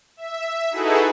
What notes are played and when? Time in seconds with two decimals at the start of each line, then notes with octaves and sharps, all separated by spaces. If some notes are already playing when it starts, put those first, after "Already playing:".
0.17 E5
0.71 D#4 E4 F#4 G#4 A4 B4